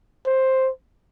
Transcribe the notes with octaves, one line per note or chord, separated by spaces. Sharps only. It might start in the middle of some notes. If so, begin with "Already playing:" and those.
C5